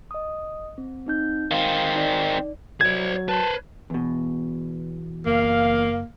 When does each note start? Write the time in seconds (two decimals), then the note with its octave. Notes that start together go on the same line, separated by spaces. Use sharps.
0.11 D#5 D#6
0.78 C4
1.06 C4 D#4 G6
1.51 D#3 C4 F5
1.95 D#4 D5
2.81 F#3 C5 D5 G#6
3.29 B4 C5 A5
3.90 E2 B2
5.26 F#1 A#3 F5